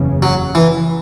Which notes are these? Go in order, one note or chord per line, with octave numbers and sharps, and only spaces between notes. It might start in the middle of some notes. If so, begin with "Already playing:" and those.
Already playing: F#1 E2 C#3
F#3
E3